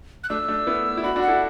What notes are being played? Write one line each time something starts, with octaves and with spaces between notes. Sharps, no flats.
F#6
A3 D4 E6
A3 D4
B3 E4
E4
D4 F#4 B5
D4 F#4
F#5
E4 A4